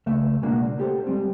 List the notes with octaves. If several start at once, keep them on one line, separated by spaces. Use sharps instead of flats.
C#2 A3 E5
B2 G#3 A#3 D4 F#4
G4 A4 C5
G3 G#3 C4